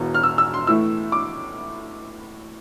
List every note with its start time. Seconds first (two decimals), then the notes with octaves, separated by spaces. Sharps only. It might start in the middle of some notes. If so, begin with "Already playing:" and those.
Already playing: E1 E2 B2 B3
0.15 F6
0.23 E6
0.38 E6
0.54 C6
0.67 A2 E3 A3 E4 E6
1.12 D6